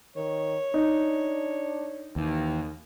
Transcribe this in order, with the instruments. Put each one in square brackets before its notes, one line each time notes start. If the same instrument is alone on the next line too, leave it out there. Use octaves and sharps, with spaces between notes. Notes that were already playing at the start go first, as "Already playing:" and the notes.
[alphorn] D#3 [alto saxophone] C#5
[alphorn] D4 [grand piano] D#4
[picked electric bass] D#2 [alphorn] E3